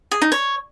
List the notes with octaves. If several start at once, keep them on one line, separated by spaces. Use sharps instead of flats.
G#4
D#4
C#5